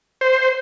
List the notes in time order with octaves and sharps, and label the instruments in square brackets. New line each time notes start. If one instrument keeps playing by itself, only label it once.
[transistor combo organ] C5